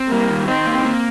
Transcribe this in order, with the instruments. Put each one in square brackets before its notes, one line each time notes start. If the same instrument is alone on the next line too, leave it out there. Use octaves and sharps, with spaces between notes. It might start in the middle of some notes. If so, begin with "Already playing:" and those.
Already playing: [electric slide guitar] C4
[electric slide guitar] G3 [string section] A#3
[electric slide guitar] D#3
[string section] C4 [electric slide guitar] D#4
[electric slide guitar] A#3
A#3